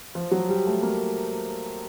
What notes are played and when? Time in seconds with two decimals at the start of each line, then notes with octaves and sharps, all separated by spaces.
0.15 F3
0.31 F#3
0.49 G3
0.66 A3
0.83 A#3